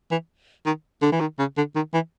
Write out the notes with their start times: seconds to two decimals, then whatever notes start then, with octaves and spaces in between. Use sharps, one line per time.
0.11 E3
0.66 D#3
1.02 D3
1.12 E3
1.20 D#3
1.39 C#3
1.57 D3
1.76 D#3
1.93 E3